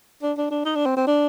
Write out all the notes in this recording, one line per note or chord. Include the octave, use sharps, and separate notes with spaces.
D4
D4
D4
D#4
D4
C4
C4
D4